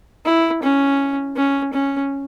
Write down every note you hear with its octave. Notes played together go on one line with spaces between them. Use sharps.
E4
C#4
C#4
C#4